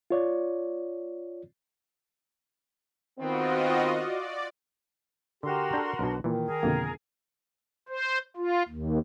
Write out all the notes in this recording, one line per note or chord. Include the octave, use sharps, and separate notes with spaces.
F4 C#5 D5
D#3 B3 C4 F4 F#4 D#5
D5
D3 F#4 G4 A#4 F#5 C6
D4 A4 G6
B1 B2 D4
A#2 D#3 E3
G#4 A#4
F2 B2 D3 A#3
C5
F4
D#2